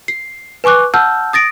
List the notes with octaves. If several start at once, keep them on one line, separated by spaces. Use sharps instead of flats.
C7
B4 G#5 C#6 D6 F#6
F#5 A5 E6 F6 G6
D#6 A6 A#6 D7